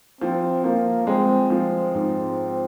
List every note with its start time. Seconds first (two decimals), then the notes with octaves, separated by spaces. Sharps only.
0.21 F3 C4
0.64 F3 A#3
1.07 G#3 C4
1.50 F3 C4
1.95 G#2